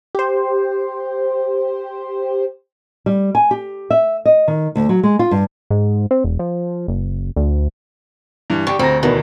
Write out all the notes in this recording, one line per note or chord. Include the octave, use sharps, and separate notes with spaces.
G4 C5
G3
G#5
G4
E5
D#5
D#3
D2
F#3
G#3
F4
G2
G#2
C4
E1
F3
F#1
D2
G2 E3
D3 G4 G5 C#6
D2 C4 A#5 A#6
E2 B2 D#3